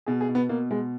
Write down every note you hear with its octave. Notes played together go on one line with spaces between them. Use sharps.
B2 G#4
G#4
B2
B3
B2 A#3
B2 G#3